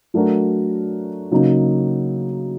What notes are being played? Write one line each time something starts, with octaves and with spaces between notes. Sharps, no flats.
F#3 A3 D4 F#4 A#4
C#3 F#3 A#3 D#4